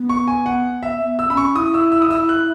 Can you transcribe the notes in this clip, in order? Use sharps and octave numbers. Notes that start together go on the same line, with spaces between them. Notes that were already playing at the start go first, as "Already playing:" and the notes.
Already playing: B3
C#6
G#5
F#5
E5
B3
E6
C#4 B5
C#6
E4 D#6
E6
E6
D#6
E4 E6
F#6